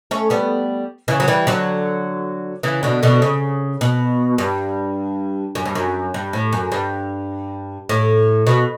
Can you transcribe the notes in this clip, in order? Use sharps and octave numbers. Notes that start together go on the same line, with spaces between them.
A3 C#4
G3 B3
C#3 E3
F#3
E3 G3
D3 F#3
C#3 E3
B2 D3
B2 D3
C#3
B2
G2
F#2
G2
F#2
G2
A2
F#2
G2
A2
B2